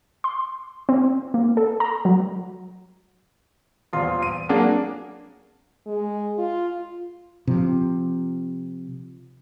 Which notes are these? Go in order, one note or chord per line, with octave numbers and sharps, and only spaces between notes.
C6
C4
A#3
A4
A#5
F#3
D#1 E2 F4 C6
D#7
F#3 A#3 D4 G#4
G#3
F4
C3 F3